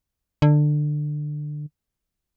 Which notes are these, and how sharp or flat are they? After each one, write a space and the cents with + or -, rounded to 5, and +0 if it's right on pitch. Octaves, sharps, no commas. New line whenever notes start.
D3 +20